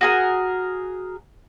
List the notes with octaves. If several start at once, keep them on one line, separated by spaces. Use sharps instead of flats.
F#4 G#4 A#4